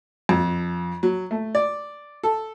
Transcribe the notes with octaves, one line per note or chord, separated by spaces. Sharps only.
F2
F#3
A3
D5
A4